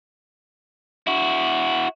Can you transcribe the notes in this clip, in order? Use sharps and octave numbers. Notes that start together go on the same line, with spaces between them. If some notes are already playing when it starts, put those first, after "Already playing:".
E4 F#4